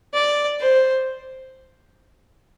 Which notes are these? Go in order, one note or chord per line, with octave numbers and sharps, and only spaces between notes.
D5
C5